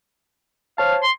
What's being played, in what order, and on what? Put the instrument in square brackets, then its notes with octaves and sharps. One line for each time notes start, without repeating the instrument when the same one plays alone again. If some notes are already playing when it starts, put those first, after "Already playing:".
[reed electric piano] C5 C#5 A5 [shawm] F5
[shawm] C6